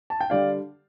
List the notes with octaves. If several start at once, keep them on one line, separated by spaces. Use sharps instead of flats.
A5
G5
D3 G3 D4 D5 F5